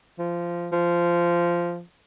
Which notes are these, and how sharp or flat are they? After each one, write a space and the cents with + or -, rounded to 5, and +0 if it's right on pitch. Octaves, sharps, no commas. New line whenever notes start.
F3 -15
F3 -15